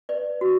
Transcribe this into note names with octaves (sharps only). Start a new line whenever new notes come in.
B4 D5
F#4